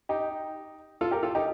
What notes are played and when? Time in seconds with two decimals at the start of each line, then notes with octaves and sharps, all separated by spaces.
0.09 D#4 G4
1.01 F4 A4
1.11 G4 A#4
1.23 F4 A4
1.35 D#4 G4